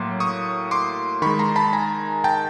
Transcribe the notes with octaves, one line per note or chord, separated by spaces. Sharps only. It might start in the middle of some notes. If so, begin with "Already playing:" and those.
Already playing: A2 F#3 A#3 C6 D6
C#6 D#6
C6 D6
D#3 G#3 B5 C#6
A#5 C6
A5 B5
G#5 A#5
G5 A5